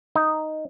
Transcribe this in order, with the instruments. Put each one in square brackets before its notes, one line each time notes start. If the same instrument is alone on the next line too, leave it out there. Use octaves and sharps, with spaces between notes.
[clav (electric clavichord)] D#4